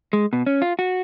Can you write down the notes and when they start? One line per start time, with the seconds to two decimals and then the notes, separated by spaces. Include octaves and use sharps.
0.13 G#3
0.33 B2
0.46 C#4
0.62 F4
0.79 F#4